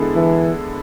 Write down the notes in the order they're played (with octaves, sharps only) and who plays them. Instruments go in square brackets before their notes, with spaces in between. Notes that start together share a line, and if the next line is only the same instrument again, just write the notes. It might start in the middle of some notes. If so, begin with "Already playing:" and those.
Already playing: [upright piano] D3 G#3 B3 E4 A4
[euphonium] E3